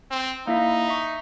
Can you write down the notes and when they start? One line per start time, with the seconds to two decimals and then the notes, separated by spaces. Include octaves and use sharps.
0.11 C4
0.47 A#3 D#4 E4 E5
0.89 E5 C#6